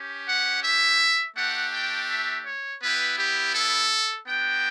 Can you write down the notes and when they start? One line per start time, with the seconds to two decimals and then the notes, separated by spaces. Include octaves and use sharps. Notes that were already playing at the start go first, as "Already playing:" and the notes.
Already playing: C#4 G4
0.28 F#5
0.63 E5
1.37 A3 D4 G4 F#5
1.73 G5
2.09 E5
2.45 C#5
2.82 B3 E4 G4 B4
3.18 G4
3.55 A4
4.27 B3 D4 F#4 G5